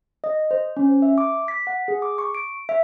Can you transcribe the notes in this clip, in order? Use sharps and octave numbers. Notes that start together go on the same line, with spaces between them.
D#5
C5
C#4
E5
D6
B6
F#5
G#4
D6
C#6
D7
E5